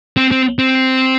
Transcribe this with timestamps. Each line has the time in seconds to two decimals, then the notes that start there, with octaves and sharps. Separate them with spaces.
0.17 C4
0.31 C4
0.59 C4